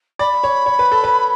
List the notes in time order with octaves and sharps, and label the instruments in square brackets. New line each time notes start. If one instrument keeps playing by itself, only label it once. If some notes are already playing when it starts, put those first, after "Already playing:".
[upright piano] D5 [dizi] B5
[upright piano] C#5
C#5
B4
A4
B4